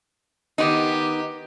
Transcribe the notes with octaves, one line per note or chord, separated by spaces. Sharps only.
D#3 B3 D#4 G4